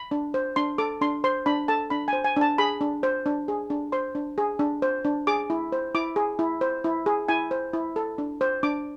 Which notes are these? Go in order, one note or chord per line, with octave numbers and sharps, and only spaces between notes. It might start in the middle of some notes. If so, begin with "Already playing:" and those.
Already playing: B5
D4
C5
D4 C6
A4 D6
D4 C6
C5 C6
D4 B5
A4 A5
D4 B5
C5 G#5
G#5
D4 A5
G#4 B5
D4
C5
D4
G#4
D4
C5 C6
D4
G#4
D4
C5
D4
G#4 D6
E4
C5
E4 D6
G#4
E4
C5
E4
G#4
E4 G#5
C5
E4
A4
D4
C5
D4 D6